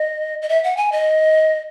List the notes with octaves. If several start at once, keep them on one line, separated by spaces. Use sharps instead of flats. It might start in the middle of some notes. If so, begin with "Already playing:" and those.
Already playing: D#5
D#5
E5
F#5
G#5
D#5